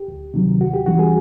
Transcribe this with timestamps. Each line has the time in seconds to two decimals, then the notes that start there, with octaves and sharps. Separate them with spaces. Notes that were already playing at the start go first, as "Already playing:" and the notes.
Already playing: G4
0.08 D2
0.34 C3 D#3 F#3
0.60 D#2 F#4
0.74 G4
0.86 C#3 E3 G3 F#4
0.99 G#4